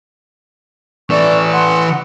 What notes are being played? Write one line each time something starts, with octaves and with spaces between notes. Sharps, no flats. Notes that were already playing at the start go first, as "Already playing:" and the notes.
E3 A4 D5 C#6
F#5 C6